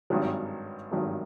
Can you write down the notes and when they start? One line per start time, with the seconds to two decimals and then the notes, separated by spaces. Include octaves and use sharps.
0.10 G#1 G2 D#3 F#3
0.92 G#1 G2 D#3 F#3